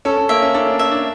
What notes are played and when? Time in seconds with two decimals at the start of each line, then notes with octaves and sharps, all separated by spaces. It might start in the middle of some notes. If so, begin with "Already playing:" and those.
0.05 C#4 A4
0.17 C#4
0.29 A#3 E5
0.42 C#4
0.54 D4 A4
0.67 D4
0.79 C#4 E5
0.91 D4